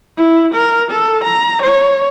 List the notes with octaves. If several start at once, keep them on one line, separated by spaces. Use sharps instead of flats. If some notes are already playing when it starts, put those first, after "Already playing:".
E4
A#4
A4
A#5
C#5